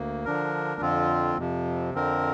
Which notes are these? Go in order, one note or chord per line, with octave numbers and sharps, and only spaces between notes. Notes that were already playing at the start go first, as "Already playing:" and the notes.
Already playing: D2 A#3
D3 F3 D4 A#4
F2 D3 F3 C4 F4
F2 C3 F3
F2 D3 F3 C4 A#4